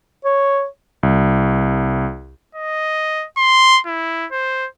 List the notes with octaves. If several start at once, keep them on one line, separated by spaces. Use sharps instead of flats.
C#5
C2
D#5
C6
E4
C5